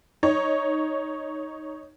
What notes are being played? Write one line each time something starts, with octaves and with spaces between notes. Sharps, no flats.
D#4 C#5